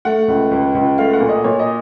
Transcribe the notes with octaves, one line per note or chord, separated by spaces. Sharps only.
A3 F#5
C#2
C#2
C#2
A3 F5
F#5
A#2
D#5
A#2 C#5
D#5